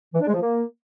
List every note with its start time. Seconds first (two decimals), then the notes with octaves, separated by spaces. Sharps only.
0.14 E3
0.20 D4
0.27 G#3
0.34 F3
0.40 A#3